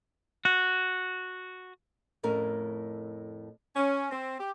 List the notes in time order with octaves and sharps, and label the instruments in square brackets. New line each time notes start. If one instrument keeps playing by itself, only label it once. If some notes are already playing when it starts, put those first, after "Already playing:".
[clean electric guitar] F#4
[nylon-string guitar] F2 A2 C#4 A#4
[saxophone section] C#4
C4
G4